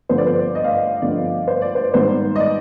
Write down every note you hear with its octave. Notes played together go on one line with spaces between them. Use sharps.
G2 D3 F3 B3 C5
D5
C5
D#5
F5
D#5
G2 D3 F3 B3 D5
C5
D5
C5
G#2 D#3 G3 B3 C5
D#5
D5